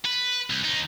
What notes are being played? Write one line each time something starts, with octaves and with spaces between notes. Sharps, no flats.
B4
C2
D#2 D#4